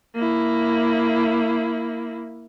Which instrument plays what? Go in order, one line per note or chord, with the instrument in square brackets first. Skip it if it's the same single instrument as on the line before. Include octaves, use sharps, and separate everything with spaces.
[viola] A#3 E4